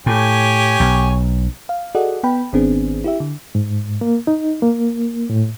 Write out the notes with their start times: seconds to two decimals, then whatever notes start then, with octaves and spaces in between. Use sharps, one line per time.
0.06 A2 G4 C#5 G#5
0.80 B1
1.69 F5
1.95 F#4 G#4 A4 D5 D#5 F#5
2.23 B3 G5 B5
2.53 G#1 D#3 B3 C4 D4 G#4
3.04 E4 G4 E5
3.20 D3
3.55 G#2
4.01 A#3
4.27 D#4
4.62 A#3
5.30 A2